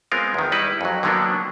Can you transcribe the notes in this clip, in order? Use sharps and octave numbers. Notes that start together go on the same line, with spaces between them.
G#3 B3 C4 F4 A#4
E2 D#3
G3 D#4 E4 B4
F2 F#3
D3 D#3 F#3 A#3 B3 D4